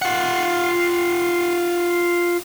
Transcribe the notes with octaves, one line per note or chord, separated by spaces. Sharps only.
F4 F#5